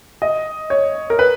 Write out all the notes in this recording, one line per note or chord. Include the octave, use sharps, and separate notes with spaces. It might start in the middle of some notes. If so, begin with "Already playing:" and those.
D#5
C#5
A#4
B4